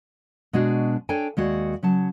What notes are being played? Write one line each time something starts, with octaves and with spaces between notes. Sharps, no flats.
B2 G#3 D4 F#4
D4 A4 C#5 G5 G#5
D#2 G#3 F#4 D5
C#3 F#3 A5